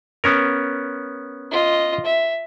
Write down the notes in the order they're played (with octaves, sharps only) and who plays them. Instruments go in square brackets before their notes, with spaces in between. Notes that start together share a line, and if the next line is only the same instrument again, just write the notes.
[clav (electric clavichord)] B3 C#4 A#4
[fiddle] F4 D#5
E5